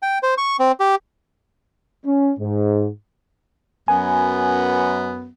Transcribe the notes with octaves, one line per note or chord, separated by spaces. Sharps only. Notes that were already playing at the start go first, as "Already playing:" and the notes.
G5
C5
C#6
C4
G4
C#4
G#2
F#2 B3 G#5